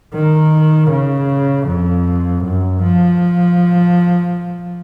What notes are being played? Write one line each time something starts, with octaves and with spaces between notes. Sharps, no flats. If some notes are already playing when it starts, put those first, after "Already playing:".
D#3
C#3
F2
F#2
F3